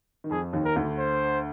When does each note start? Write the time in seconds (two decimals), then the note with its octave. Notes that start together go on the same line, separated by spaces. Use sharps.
0.24 D#3
0.31 F2 F3 G#4
0.53 D#2 D#3
0.65 A#4
0.76 D2 D3
0.98 C5